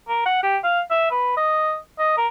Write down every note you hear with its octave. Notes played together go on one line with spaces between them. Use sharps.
A#4
F#5
G4
F5
E5
B4
D#5
D#5
A#4